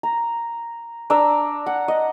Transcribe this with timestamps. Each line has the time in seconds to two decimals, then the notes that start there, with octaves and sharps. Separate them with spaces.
0.03 A#5
1.10 D4 D5 A#5 E6
1.66 F#5
1.88 D#5